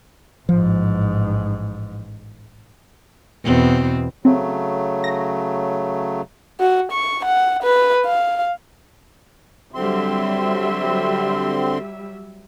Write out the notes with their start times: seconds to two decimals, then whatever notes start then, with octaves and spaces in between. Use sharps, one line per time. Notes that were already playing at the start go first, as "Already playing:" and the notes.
0.49 A1 G#2 F3
3.45 E2 B2 C4
4.25 C#3 F#3 A3 C4
5.04 A#6
6.60 F#4
6.92 C#6
7.25 F#5
7.63 B4
8.06 F5
9.75 D3 F#3 G3 C4 E5 C6